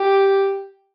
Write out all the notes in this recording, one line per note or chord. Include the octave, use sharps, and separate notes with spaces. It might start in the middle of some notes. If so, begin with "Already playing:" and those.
Already playing: G4